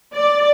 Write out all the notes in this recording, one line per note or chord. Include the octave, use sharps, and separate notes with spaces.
D5